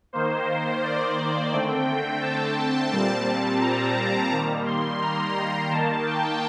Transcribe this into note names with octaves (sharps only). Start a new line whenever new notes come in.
D#3 A#3 C5
D5
D3 A3 C4 G5
A5
A#2 G3 C4
A#5
D#3 G3 A#3
C6
A#5
D#3 A#3 A5
G5